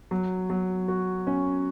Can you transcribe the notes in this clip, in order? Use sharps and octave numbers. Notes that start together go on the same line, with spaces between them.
F#3
F#3
F#4
C#4